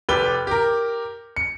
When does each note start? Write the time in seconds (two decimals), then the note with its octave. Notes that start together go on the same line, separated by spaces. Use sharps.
0.09 F1 G4 B4 G7
0.47 G4 A#4
1.36 C#7